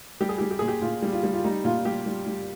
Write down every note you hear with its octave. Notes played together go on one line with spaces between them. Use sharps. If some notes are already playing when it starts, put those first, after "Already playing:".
G3 G4
G#4
G3 G4
G4
A#2 G#4
G4
A#2 F4
G3
F4
G3
F4
G3 D#4
A#2 F4
G3 G4
G3
G3